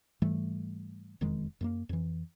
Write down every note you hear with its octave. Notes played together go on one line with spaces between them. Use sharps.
G#2 E3 G3 A3
E1 F2 D#3 G#3
F#2 A3 A#3
F2 E3